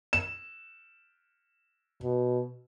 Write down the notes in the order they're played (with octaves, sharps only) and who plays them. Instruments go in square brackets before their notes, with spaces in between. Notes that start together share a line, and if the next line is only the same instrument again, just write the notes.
[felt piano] E7
[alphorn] B2